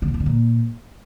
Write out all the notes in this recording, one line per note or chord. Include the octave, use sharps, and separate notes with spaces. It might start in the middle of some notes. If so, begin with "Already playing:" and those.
D3
B2
E3
D3
A#2